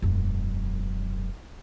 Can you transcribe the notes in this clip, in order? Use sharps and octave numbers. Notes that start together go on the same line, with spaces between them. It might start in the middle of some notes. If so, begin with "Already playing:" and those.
E1 F#2